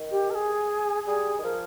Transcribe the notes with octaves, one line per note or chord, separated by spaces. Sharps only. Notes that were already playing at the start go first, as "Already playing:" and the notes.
Already playing: D#3
G4
A#4
G#4
G3 G#4
D#3
F3 A#4